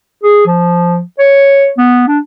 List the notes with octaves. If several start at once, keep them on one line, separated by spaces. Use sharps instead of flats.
G#4
F3
C#5
B3
D4